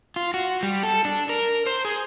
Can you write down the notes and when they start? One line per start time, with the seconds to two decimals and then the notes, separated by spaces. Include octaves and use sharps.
0.16 F4
0.34 F#4
0.63 G3
0.83 A4
1.05 D4
1.29 A#4
1.67 C5
1.85 G#4